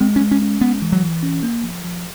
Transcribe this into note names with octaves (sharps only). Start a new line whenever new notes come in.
G#3 C4
C#4
G#3
C#4
C#4
G#3 B3
E3
F#3
E3
C#4
A#3
F3
F3